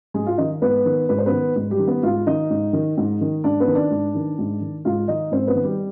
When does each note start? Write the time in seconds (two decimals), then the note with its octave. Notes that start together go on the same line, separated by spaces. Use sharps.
0.14 G#2 G#3 G#4
0.26 F4 F5
0.38 D#3 D#4 D#5
0.62 G#2 B3 B4
0.86 D#3
1.09 G#2 B4
1.18 C5
1.26 B3 B4
1.32 D#3
1.56 G#2
1.71 G3 G4
1.79 D#3
1.87 B3 B4
2.03 G#2 F4 F5
2.27 D#3 D#4 D#5
2.50 G#2
2.73 D#3
2.98 G#2
3.21 D#3
3.44 G#2 D4 D5
3.60 B3 B4
3.67 D#3
3.75 D4 D5
3.91 G#2
4.15 D#3
4.39 G#2
4.61 D#3
4.85 G#2 F4 F5
5.08 D#3 D#4 D#5
5.31 G#2 C4 C5
5.47 B3 B4
5.55 D#3
5.63 G3 G4